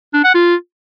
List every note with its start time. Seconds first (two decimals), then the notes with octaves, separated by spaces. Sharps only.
0.14 D4
0.24 F#5
0.35 F4